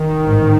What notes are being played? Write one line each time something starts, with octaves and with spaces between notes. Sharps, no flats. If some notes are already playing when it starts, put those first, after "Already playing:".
Already playing: D#3
A1 G#2